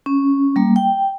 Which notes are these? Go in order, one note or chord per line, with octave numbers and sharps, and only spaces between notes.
C#4
G3 A#3
G5